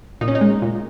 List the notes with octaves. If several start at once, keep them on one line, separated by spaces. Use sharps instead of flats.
A#2 D#4
C#4
D#4
G#3
A#2